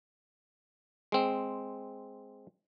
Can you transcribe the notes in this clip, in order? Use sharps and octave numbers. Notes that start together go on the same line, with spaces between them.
G#3 C4